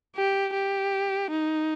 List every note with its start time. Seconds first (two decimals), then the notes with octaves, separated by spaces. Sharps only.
0.16 G4
0.54 G4
1.31 D#4